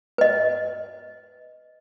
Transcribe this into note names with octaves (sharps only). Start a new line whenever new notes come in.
B4 D#5